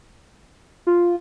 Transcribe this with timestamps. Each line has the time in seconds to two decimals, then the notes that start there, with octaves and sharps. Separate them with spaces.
0.87 F4